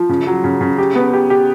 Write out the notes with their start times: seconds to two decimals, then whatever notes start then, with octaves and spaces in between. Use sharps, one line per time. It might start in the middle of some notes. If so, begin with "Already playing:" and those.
Already playing: F3
0.09 C#3
0.27 F#3
0.44 C#3
0.61 C#3
0.78 G4
0.95 B3
1.13 G4
1.30 G4